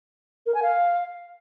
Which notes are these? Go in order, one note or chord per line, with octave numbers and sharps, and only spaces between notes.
A#4
G#5
F5